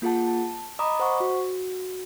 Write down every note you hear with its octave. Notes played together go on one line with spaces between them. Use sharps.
A#3 F4 G#4 F#5 A5
A5
D#5 A#5 B5 D6 D#6
C5 F#5 C#6
F#4